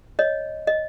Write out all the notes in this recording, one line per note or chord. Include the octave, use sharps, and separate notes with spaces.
C#5 D#5
D#5